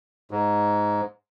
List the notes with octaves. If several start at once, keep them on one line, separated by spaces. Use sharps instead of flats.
G#2